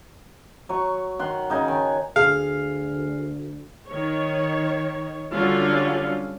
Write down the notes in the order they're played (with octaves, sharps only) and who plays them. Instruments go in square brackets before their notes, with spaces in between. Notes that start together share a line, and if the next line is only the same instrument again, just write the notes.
[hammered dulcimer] F#3 C#6
D#3 F#5 C6
C#3 D#4 G#5
D#3
[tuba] D2 [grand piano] G#4 [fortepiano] F5
[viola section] D#3 C#5
D3 F#3 G3 C#4 F4 F5